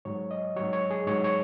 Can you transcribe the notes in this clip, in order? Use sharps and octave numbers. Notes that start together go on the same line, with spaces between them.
G#2 F#3 C#5
D#5
G#2 F#3 C#5
C#5
G#4
G#2 F#3 C#5
C#5